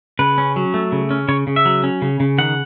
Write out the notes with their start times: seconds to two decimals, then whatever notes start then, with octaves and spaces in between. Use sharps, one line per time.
0.19 C#3 B4
0.38 C#4
0.56 F#3
0.74 A3
0.92 C#3
1.11 C#4
1.28 C#3 C#5
1.47 C#3
1.56 E5
1.65 F#3
1.84 C#4
2.02 C#3
2.20 C#3
2.38 D#3 F#5